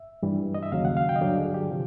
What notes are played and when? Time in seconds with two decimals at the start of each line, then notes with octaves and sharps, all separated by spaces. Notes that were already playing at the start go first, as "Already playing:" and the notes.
Already playing: E5
0.22 G2 E3 G3
0.55 D#5
0.63 E5
0.72 D#2 C#3 F#3 F5
0.85 F#5
0.97 F5
1.09 G5
1.16 D#5
1.21 G2 D3 F#3 D5
1.38 G#4
1.54 G4
1.71 C3 F3